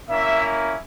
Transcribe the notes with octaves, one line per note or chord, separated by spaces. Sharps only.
A#3 C#4 E4 E5